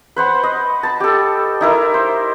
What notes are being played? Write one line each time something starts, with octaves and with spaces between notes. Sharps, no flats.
B4 C5 F#5 B5
D#5
A5 B5
G4 A4
D#4 E4 A#4
C5